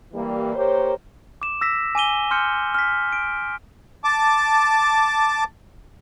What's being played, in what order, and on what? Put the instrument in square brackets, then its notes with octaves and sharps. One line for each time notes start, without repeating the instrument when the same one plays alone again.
[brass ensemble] E3 G3 A#3
A#3 G4 A#4 C5 C#5
[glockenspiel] D6 E7
E6 A#6 B6 E7
G#5 D6 D#7 G7
C6 F6 G6 C#7
F6 B6
D7
[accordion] A5 D6